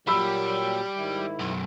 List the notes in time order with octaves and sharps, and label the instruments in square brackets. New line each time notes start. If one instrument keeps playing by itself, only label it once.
[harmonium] A#2 F#3 G4 [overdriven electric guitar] G3 [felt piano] B5 E6
[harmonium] G#2 D#3 E4
[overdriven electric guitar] B1 F#2